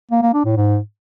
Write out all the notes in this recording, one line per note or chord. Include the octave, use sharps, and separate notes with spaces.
A#3
A#3
D4
A2
G#2